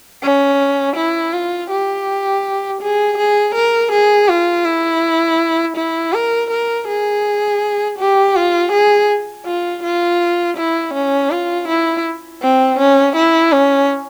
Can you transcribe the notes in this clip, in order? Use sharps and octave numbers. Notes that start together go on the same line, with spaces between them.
C#4
E4
F4
G4
G#4
G#4
A#4
G#4
F4
E4
E4
A#4
A#4
G#4
G4
F4
G#4
F4
F4
E4
C#4
F4
E4
C4
C#4
E4
C#4